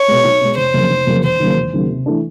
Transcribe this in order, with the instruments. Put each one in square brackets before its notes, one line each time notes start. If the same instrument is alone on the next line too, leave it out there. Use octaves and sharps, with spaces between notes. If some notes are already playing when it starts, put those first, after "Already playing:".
Already playing: [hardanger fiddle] C#5
[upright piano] B2 G#3
B1
B2 G#3
[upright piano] F1 [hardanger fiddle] C5
[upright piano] F2 C#3 F#3 A#3
F1
F2 C#3 F#3 A#3
[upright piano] E1 [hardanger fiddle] C5
[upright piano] D#2 C#3 F#3 A#3
E1
D#2 C#3 F#3 A#3
C3
E3 A3 D4